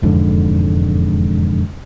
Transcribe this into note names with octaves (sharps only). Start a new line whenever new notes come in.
E1 F2 G#2 D3